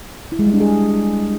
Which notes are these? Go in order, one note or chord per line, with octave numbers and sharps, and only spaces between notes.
E4
G#3
G3
D4
G#4